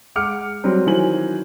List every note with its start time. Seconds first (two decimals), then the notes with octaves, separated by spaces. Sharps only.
0.15 G#3 F#5 D6 F6 C#7
0.64 F#3 G3 C4
0.86 D#3 E3 F#3 C5 G#5 F#7